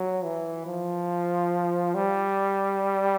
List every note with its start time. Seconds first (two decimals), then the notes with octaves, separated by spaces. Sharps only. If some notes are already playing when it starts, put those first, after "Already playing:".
Already playing: F#3
0.24 E3
0.66 F3
1.95 G3